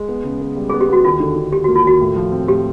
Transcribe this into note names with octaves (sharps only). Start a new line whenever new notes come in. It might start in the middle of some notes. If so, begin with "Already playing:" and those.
Already playing: G#3
B3
C#3
B3
G3
B3 G#4
G4
B3 F#4
D#2 F4
D3
D3
D#2 G4
A#3 F#4
F4
D#2 F#4
A2
F3
C4
A2 G4